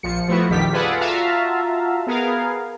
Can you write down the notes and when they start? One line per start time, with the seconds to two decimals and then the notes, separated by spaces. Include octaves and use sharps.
0.03 A#1 F3 C#7
0.28 F3 A3 B3 E4 F#4
0.49 A#1 F2 D#3 G3 G4 B6
0.72 F4 G#4 A4 B4 D5 F#5
0.99 F4 F#4 E5 F5 A5 A#5
2.07 B3 G#4 A#4 F5